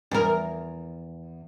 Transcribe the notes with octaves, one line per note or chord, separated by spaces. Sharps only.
E2 A#4